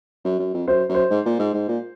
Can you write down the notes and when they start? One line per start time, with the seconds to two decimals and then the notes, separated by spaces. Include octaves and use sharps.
0.25 F#2
0.39 F#2
0.54 F2
0.68 F#2 C5
0.89 F#2
0.95 C5
1.10 G#2
1.26 A#2
1.39 G#2
1.54 G#2
1.68 A#2